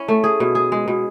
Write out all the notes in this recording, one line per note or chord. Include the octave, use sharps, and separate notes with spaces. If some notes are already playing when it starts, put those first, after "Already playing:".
Already playing: C#4 E4
A3
G#4
B2
G#4
G#3
B2